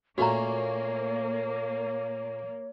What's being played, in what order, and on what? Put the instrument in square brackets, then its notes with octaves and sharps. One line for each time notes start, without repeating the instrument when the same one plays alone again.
[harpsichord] A#2 A3 C#4 [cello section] A#3 [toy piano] F#4 A#5 [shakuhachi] C#5